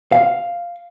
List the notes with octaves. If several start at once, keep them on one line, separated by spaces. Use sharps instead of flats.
F5